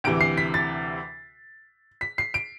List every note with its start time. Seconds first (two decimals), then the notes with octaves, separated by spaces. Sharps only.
0.04 D2 C3 E3 D7
0.21 C7
0.38 B6
0.54 A6
2.01 B6
2.18 C7
2.34 D7